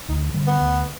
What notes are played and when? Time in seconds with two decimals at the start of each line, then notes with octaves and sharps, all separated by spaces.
0.08 D2 D#4
0.34 D3 G3
0.47 B3
0.61 D2